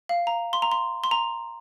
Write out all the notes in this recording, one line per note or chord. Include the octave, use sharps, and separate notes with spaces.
F5
A#5
C6
A#5
C6
C6
A#5